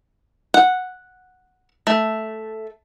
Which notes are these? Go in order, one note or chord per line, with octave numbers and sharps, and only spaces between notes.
F#5
A3